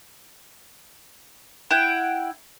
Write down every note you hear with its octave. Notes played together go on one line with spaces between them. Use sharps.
E4 F#5 G5